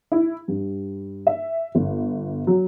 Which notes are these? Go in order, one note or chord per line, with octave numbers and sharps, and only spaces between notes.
E4
G2
E5
G1
F#3